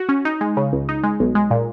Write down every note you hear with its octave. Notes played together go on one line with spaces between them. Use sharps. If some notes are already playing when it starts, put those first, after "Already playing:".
Already playing: F#4
C#4
D#4
G#3
C#3
C#2
D#4
G#3
B1
G#3
A#2